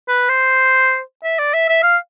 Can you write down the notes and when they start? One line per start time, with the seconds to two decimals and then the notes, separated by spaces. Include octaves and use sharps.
0.08 B4
0.29 C5
1.24 E5
1.39 D5
1.54 E5
1.69 E5
1.83 F5